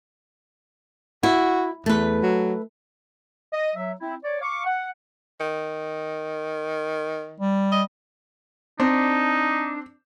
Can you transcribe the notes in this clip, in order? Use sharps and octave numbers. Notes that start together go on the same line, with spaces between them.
E4 F#4
E2 A3 B4
F#3
D#5
F#3 E5
C4 E4
C#5 D5
F5 C#6 D6
F#5
D#3
G3
D#5
C4 D4 D#4